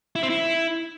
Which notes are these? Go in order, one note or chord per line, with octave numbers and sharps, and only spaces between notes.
E4
C4
E4